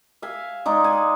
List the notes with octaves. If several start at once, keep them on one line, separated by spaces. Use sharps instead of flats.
E5 F5 G#5
G#3 D#4 D5
G#5